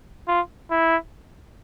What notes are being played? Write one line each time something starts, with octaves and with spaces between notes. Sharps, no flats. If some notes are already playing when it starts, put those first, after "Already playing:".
F4
E4